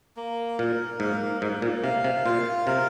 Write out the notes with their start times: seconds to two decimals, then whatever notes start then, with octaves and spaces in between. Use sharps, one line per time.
0.17 A#3
0.59 A#2 A#4
1.00 G#2 A#3
1.42 G#2 A#3
1.62 A#2
1.83 C3 F5
2.04 C3
2.25 A#2 F4
2.67 C3 A#4